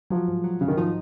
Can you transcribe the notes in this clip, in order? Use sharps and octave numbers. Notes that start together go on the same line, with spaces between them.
F3 F#3
G#2
F#3
C#3 F#3
D#3
F3 D#4